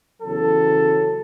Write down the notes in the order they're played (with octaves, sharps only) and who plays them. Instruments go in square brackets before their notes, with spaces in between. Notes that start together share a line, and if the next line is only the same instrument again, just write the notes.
[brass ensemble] E2 C#3 F#3 A4